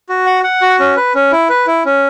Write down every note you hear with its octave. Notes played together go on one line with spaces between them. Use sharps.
F#4
F#5
F#5
F#4
C#4
B4
C#4
E4
B4
E4
C#4